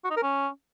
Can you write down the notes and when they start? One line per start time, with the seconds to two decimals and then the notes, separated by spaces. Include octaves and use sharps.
0.04 F#4
0.10 D#4
0.17 A#4
0.23 C#4